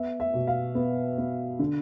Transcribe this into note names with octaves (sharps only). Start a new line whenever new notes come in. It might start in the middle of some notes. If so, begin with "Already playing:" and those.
Already playing: B3 E5
E5
B2
F5
B3
B3
D3